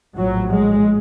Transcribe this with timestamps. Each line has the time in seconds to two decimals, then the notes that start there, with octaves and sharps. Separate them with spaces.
0.16 A#1 A2 F#3
0.54 G#3